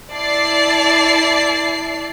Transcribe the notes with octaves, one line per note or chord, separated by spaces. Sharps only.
E4 D5 A5 C7